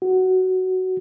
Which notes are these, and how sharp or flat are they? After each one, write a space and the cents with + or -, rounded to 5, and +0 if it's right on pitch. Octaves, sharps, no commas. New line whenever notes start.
F#4 +10